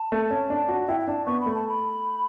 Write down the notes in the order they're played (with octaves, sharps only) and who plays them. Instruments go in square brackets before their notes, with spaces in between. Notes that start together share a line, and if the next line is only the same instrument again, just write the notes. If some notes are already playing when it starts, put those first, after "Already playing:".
Already playing: [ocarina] A5
[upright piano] A3
C#4
D4
F#4
[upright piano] E4 [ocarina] G5
[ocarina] G5
[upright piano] D4 [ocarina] A5
[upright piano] B3 [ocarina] C#6
[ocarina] B5
[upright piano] A3
[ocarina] A5
B5